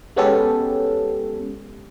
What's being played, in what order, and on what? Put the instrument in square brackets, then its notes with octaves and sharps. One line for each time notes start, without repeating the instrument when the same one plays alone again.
[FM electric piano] G#3 B3 C#4 G4 A4